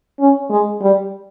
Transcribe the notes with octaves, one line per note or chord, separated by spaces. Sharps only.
C#4
G#3
G3